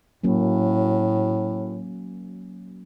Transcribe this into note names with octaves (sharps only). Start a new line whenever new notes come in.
A2 F#3 A#3 C#4